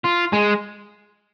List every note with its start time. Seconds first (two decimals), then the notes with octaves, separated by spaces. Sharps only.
0.05 F4
0.33 G#3